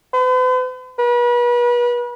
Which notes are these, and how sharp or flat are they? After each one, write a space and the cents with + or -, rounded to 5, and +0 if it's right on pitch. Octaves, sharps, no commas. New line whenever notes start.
B4 +45
B4 -35